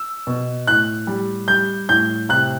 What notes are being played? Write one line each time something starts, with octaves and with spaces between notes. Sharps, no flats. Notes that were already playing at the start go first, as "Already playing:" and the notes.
Already playing: E6
B2
A2 F#6
G3
G3 G6
A2 G6
C3 F#6